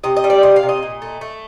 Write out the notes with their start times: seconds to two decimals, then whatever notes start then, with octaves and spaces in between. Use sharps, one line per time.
0.04 C3 D#5
0.17 D#5
0.24 G3
0.30 D5
0.43 C3 D#5
0.56 F5
0.63 C3
0.69 D#5
0.82 A#2
1.02 A3
1.21 A3